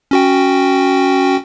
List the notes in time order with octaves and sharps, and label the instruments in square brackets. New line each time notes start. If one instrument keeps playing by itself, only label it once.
[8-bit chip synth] C#4 F#4 G5